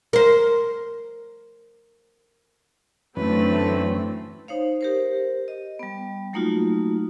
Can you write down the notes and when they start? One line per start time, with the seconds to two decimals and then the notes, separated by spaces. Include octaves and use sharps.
0.13 A#4 C5
3.17 F#2 D3 E3 A3 C4 C#4 B4
4.48 D#4 C5 C#5 F5
4.81 G4 A#4 C5
5.48 D#5
5.79 G3 B3
6.33 F#3 A3 A#3 D#4 F4 F#4